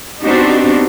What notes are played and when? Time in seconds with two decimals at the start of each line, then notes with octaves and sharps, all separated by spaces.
0.23 B3 C4 D4 D#4 F#4 G4